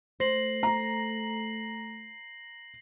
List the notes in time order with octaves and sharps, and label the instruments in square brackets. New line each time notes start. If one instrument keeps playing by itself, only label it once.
[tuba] A3 [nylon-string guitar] C5 [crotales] A#6 C7 F#7
[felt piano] A#5